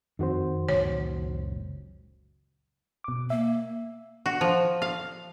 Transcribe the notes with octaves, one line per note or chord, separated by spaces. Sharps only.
F2 D#3 C4 F#4 C5
F#1 C#2 A#2 C#5
B2 D6
A#3 E5
F#4
F3
F5